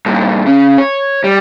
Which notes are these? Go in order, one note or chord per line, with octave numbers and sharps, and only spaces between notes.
G2 A#2
C#3 C#4
C#5
G3